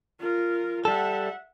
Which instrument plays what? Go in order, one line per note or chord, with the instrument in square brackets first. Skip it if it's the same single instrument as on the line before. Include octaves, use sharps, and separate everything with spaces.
[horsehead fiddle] F4 A#4
[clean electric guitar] G3 A4 [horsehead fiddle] E5 F#5